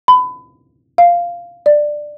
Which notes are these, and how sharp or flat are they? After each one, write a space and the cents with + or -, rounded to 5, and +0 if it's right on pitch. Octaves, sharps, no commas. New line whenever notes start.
B5 +30
F5 -5
D5 +10